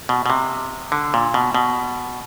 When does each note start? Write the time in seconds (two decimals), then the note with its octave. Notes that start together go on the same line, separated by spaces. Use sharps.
0.09 B2
0.26 B2
0.30 C3
0.92 D3
1.14 A#2
1.34 B2
1.54 B2